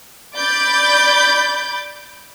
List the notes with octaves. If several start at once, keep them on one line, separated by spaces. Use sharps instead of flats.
D5 B5 D6 G6 A6